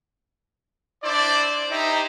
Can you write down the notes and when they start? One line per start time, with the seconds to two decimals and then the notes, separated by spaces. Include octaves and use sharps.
1.03 D4 E4 C5 D5
1.71 D#4 E4 G4 C5 E5 A#5